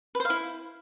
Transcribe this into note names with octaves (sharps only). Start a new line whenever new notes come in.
B4
C5
F5
E4